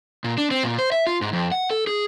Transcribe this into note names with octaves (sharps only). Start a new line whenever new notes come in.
A#2
D4
C4
A#2
C5
E5
F4
G#2
F2
F#5
A4
G#4